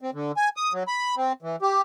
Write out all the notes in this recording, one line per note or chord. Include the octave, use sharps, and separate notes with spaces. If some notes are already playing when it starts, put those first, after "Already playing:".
C4
D3
G#5
D#6
F#3
B5
C4
E3
G4